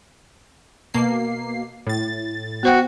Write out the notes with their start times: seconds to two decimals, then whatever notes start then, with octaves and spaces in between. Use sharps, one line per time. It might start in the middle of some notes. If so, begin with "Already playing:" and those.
0.94 B2 A#3 C7
1.87 A2 A6
2.63 B3 F#4 C5 G5